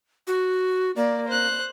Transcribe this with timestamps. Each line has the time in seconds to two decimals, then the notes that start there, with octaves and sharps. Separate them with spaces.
0.27 F#4
0.96 A#3 D5
1.27 C5 F#6